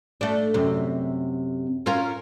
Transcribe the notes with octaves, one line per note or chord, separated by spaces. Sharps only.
A3 D4
F#2 C3
C#4 F4 A#4